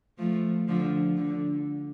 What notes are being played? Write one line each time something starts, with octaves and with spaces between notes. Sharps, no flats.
F3 A3
D3 F3
D3